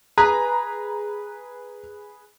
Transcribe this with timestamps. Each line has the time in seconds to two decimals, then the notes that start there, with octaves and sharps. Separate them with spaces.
0.18 G#4 B4 A#5